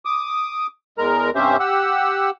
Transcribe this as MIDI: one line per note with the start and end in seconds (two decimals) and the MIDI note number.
0.05 0.67 86
0.05 0.67 87
0.98 1.30 40
0.98 1.30 56
0.98 1.30 70
0.98 1.30 82
1.35 1.57 43
1.35 1.57 48
1.35 1.57 61
1.35 1.57 67
1.35 1.57 72
1.35 1.57 76
1.60 2.30 67
1.60 2.30 78
1.60 2.30 88